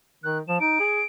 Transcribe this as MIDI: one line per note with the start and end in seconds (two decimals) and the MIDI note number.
0.24 0.40 51
0.24 0.38 90
0.48 0.60 53
0.48 0.59 100
0.60 0.77 63
0.60 1.05 98
0.80 1.02 68